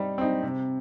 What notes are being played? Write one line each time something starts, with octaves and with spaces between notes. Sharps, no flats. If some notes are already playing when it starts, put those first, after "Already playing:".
Already playing: G3 C4 D#4
C4 D#4
C3